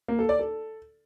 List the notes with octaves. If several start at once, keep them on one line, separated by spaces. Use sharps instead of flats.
A#3
A4
D5
A4